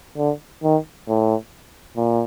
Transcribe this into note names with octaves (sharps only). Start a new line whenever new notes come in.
D3
D#3
A2
A#2